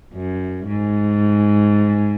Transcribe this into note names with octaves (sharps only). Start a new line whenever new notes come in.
F#2
G#2